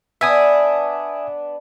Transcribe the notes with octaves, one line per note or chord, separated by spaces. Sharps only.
B3 D4 E5 G#5 D#6